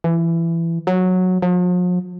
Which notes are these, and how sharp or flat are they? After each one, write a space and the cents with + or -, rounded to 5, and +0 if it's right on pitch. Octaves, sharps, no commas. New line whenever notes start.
E3 +20
F#3 -10
F3 +45